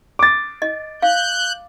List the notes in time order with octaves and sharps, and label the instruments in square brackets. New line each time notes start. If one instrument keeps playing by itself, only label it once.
[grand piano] D6 A6
[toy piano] D#5
[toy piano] F5 [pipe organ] F#6 G6